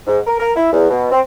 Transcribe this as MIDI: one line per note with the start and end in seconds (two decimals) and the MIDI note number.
0.07 0.19 44
0.26 0.35 70
0.39 0.51 70
0.56 0.68 64
0.73 0.88 40
0.90 1.10 47
1.11 1.20 60